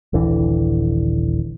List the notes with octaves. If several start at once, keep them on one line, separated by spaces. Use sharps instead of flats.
D#1 A#1 D3 E3